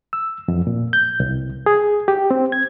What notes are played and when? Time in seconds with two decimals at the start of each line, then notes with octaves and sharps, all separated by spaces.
0.13 E6
0.48 F2
0.67 A#2
0.93 G6
1.20 C2
1.66 G#4
2.08 G4
2.31 C4
2.52 G#6